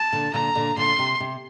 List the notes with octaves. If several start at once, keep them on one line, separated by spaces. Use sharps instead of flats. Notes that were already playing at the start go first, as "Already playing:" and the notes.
Already playing: A5
A#2 D3
A#2 D3 A#5
A#2 D3
A#2 D3 C6
C3
C3